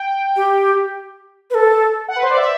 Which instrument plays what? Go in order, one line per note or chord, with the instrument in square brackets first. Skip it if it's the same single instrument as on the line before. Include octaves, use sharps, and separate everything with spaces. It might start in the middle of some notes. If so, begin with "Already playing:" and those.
Already playing: [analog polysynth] G5
[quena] G4
B4
A4
[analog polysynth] F#5
B4
C5
D5
E5